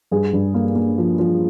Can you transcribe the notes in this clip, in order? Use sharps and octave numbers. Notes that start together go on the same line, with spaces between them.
G2 G#4
G2
A#3
A#3
F3
F3